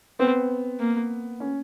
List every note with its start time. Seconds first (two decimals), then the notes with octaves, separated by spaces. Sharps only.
0.19 B3 C4
0.79 A#3
1.40 C#4